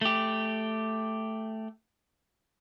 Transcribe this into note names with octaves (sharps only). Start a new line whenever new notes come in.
A3 G4